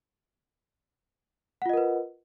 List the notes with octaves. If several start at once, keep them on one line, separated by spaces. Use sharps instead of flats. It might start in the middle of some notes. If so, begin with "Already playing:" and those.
F4 A#4 B4 D#5 F#5